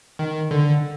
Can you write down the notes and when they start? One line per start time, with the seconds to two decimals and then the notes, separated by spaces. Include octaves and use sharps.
0.19 D#3
0.51 D3